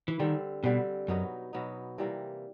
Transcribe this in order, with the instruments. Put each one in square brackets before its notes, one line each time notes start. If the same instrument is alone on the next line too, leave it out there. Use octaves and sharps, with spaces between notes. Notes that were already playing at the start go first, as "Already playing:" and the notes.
[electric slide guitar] E3
[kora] D3 G3 C4 [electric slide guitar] D#3
[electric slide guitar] B2 [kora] D3 G3 C4
[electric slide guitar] F#2 [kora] B2 F#3 B3 D#4
[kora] B2 F#3 B3 D#4
C3 E3 G3 A#3